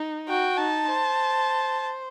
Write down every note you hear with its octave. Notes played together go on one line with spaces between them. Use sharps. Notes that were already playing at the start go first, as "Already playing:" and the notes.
Already playing: D#4
F#4 G5
D#4 A5
C5